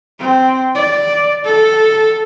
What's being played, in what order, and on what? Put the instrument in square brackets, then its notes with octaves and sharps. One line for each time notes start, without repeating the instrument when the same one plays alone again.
[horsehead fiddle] C4
D5
A4